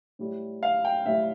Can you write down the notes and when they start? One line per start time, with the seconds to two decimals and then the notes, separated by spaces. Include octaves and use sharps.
0.19 A2 G3
0.63 F5
0.85 G5
1.06 A2 G3 E5